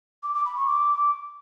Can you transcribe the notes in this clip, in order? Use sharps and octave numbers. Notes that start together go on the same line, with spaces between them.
D6
D6
B5
C#6
D6